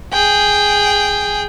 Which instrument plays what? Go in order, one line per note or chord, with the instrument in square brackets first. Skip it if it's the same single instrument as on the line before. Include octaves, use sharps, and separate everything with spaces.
[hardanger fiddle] G#4 G5